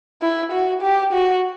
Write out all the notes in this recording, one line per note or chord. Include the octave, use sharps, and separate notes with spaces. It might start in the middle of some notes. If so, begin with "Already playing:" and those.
E4
F#4
G4
F#4